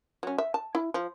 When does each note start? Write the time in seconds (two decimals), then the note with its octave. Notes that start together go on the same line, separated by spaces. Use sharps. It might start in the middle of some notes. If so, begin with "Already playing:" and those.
0.23 F#3 C#4
0.38 E5
0.54 A5
0.75 E4
0.94 F3